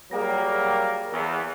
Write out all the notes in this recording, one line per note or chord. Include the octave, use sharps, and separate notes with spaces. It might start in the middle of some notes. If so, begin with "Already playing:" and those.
F#3 G3 A#3 G#4 G5 A#6
E2